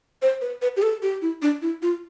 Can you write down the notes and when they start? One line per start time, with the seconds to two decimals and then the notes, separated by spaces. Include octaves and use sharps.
0.22 C5
0.41 B4
0.62 B4
0.77 G4
0.82 A4
1.02 G4
1.22 E4
1.42 D4
1.62 E4
1.82 F4